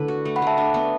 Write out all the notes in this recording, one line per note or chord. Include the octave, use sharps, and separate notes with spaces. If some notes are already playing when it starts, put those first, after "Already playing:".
Already playing: D3 A3 E4 B4
F#4
A3
F#5 B5
A3 E5 A5
D4
B3